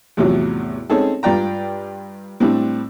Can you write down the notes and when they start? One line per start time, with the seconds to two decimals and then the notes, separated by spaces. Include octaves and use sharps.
0.17 E2 A2 C3 F3 F#3
0.90 C4 C#4 D#4 G#4 A4
1.23 G2 F4 D5 G5 A#5
2.40 A2 G3 C4 D4